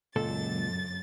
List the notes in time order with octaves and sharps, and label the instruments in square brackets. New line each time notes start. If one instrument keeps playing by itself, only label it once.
[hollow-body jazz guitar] C#2 A#2 A4 [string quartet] F#2 A6